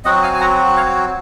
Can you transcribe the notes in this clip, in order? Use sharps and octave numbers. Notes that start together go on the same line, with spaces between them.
F#3 C4 F#4 D#5 F#5
F5 G#5
G#5
F#5 A#5
C#5 F5